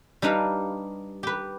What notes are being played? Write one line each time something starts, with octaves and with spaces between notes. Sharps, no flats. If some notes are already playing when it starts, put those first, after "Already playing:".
G3 D4 D#4 B4 F5
G4 B4